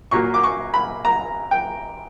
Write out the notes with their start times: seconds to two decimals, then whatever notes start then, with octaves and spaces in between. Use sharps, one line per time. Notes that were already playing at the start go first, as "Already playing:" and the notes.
0.11 A#2 F#3 A#3 C#6
0.34 D6
0.43 C#6
0.74 B5
1.05 A#5
1.51 G5